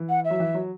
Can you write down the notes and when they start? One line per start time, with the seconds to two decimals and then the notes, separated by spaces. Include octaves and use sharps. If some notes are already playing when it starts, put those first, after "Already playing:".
Already playing: E3
0.09 F#5
0.24 E5
0.30 F#3
0.40 E3
0.54 F#3